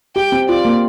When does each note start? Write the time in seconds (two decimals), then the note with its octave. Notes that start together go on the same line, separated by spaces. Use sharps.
0.16 G4 G5
0.32 C4
0.49 F4 D5
0.65 A#3